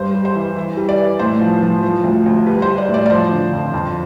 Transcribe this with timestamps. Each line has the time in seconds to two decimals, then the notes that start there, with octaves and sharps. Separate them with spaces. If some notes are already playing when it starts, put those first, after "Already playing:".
Already playing: G2 C5
0.15 G3
0.25 C5
0.35 E3
0.56 E3
0.77 G3
0.89 D5
0.99 E3
1.19 A2 C5
1.41 F3
1.62 F3
1.83 F3
2.04 D2
2.26 D2
2.46 G3 B4
2.62 C5
2.68 G3
2.78 D5
2.89 A2
2.94 D5
3.06 D5
3.10 F3 C5
3.31 D3
3.53 F2
3.74 F2